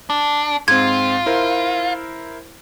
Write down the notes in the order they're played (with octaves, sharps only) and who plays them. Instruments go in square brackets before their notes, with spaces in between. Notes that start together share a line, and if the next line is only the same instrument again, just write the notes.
[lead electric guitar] D4
[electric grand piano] G#2 C4 [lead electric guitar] F4 [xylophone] G#6
[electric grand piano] E4 A#4 C5